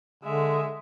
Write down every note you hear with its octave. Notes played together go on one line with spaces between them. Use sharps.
D3 G#3 E5